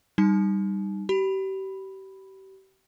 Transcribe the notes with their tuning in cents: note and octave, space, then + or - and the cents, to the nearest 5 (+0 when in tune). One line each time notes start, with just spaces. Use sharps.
G3 +0 D#4 -10 A5 -45
G4 -35 B5 +0